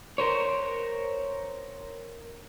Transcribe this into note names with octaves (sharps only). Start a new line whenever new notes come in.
A#4 C5 C#5